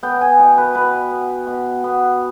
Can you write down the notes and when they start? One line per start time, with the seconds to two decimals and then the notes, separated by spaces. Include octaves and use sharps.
0.03 B3 G5
0.21 G#5
0.39 B2 G5
0.58 B4
0.75 B2 B4
1.11 B3
1.47 B2
1.84 B3